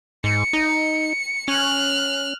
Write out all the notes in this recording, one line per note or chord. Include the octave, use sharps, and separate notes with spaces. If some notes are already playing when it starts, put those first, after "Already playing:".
G#2 C#7
D#4
C#4 F6 F#6